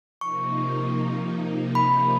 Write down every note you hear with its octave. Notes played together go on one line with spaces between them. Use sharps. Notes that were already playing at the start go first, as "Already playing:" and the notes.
C3 F3 A#3 D#4 C#6
B5